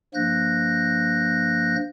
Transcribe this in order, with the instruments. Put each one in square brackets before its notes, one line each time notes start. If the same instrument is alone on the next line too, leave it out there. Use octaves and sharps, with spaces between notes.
[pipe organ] G2 F3 A#3 F#6 G6 A#6